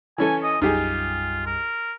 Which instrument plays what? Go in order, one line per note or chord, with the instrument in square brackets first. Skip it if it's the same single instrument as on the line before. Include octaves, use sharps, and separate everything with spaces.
[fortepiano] E3 C#4 A4 [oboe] G#5
[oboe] D#5
[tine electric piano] B1 F#2 G3 [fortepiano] D#4 G4 G#4 [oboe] F4
[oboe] A#4